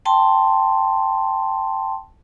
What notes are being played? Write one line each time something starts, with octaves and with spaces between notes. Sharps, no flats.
G5 A5 C6